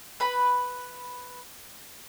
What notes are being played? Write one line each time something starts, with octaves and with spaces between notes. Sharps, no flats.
B4 B5